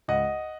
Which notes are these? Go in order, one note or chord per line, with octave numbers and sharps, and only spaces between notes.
C#2 D#5 F#5